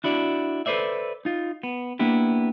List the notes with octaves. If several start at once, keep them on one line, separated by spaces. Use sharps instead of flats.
D4 E4 F#4 D5
A4 B4 C5 D5 E5
D#4 F4
B3
A#3 B3 D4 E4 G4